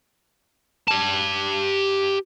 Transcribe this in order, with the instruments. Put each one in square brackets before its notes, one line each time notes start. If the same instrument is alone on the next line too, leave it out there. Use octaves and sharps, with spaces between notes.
[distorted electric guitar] G4 A5